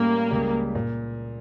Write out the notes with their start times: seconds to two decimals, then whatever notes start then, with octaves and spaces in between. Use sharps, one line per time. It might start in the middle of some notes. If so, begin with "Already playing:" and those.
Already playing: A2 G3 A#3 C#4
0.31 C#2 C#3 G3
0.75 A#2